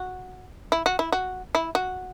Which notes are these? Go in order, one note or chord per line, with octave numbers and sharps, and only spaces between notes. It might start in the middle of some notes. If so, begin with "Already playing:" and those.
Already playing: F#4
E4
F#4
E4
F#4
E4
F#4